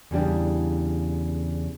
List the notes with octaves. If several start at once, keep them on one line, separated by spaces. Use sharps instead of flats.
E2 C#3 G3 D4